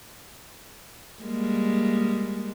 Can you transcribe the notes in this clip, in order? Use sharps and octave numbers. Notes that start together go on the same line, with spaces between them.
G3 G#3 A#3